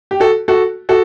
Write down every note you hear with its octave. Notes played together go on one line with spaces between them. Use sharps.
G4
F#4 A4
F#4 A4
F#4 A4